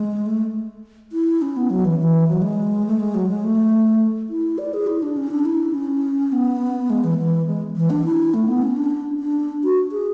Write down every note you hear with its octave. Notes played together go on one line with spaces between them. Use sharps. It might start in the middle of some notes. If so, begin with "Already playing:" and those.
Already playing: G#3
A3
E4
C#4
B3
F#3
E3
E3
F#3
G#3
A3
G#3
F#3
G#3
A3
E4
D5
G#4
E4
D4
C#4
D4
E4
C#4
B3
G#3
E3
E3
G#3
E3
D4
E4
A3
B3
C#4
D4
D4
F#4
G#4